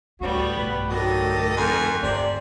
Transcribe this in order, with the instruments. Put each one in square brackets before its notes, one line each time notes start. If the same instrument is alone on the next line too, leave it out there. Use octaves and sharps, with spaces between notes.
[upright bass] D2 [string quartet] A2 G3 B3 [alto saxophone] F#4
[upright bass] B1 G2 [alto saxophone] B4
[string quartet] D2 D#3 A#6 [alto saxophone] F#3 [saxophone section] G4 A4 D#5
[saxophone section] F2 [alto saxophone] G#5
[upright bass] G2 C4 [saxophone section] C3 [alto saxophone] D5